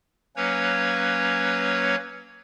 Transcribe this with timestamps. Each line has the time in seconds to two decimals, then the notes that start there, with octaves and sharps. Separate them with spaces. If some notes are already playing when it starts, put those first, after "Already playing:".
0.36 F#3 A#3 C#4 B4 C#5